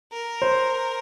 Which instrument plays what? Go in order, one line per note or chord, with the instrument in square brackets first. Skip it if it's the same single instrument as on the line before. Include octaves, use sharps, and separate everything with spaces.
[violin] A#4
[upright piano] C5